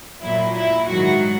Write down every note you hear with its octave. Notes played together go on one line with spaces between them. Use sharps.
A#2 F#3 E4
E4
G#2 D#3 F#3 F#4